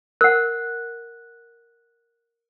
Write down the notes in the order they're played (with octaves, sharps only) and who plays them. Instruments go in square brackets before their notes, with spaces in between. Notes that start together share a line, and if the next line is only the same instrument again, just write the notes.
[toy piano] A#4 F#5 [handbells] F#6